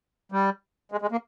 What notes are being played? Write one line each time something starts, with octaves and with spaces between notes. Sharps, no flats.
G3
G#3
G#3
A#3